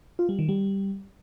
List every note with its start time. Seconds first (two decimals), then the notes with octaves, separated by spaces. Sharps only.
0.19 F4
0.29 G3
0.39 D#3
0.49 G3